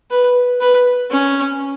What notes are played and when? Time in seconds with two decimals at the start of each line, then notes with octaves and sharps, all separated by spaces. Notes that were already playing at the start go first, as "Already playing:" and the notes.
0.11 B4
0.60 B4
1.11 C#4